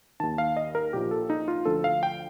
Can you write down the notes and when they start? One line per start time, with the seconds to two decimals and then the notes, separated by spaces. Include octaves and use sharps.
0.20 D#2 D#3 A5
0.38 F5
0.57 D#5
0.75 A#4
0.93 A#1 A#2 F3 G4
1.11 A4
1.30 D#4
1.48 F4
1.65 D2 D3 F3 A4
1.84 F5
2.03 G5